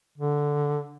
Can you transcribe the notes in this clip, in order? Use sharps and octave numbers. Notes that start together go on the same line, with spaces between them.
D3